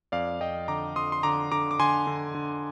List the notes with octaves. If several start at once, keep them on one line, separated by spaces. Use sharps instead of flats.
F2 D5 F5
F2 D#5 G5
D3 A#5 D6
F2 C6 D#6
C6
D3 A#5 D6
D3 A#5 D6
D6
D3 G#5 C6
D3
D3